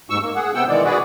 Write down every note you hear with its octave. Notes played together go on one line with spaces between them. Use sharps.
D#2 G#2 C#6 E6
A#3
G#4 F#5
C3 B3 F#5 G5 E6
B2 D#3 E3 G#3 D5
F#4 G#4 B4 D5